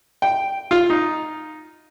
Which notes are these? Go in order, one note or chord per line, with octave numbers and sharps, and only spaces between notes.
G5
F4
D#4